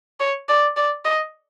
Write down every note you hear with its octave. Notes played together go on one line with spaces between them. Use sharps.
C#5
D5
D5
D#5